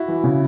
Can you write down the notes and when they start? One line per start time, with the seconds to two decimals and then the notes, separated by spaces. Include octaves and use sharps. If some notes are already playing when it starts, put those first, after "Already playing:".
Already playing: E4 F#4
0.08 E3
0.24 C#3